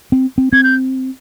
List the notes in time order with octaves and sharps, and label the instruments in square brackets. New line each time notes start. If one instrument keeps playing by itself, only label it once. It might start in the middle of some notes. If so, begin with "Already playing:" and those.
[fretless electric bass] C4
C4
[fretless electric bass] C4 [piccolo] G#6
[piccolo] G6